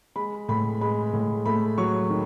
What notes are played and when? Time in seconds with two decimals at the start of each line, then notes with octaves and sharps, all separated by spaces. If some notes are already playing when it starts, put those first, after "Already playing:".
0.16 G#3 B5
0.49 A2 B5
0.81 G#3 B5
1.13 A2
1.46 A3 B5
1.78 F#3 C#6
2.10 D#3